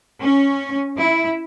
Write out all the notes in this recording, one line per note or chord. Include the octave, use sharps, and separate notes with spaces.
C#4
E4